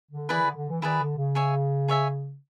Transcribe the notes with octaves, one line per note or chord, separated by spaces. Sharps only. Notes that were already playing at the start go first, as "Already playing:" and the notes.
D3
E3 E4 G#4 B4 D5
D#3
D3
D3
E3
D#3 E4 G#4 B4 D5
D3
C#3
G#4 C#5 E5 G#5
G#4 C#5 E5 G#5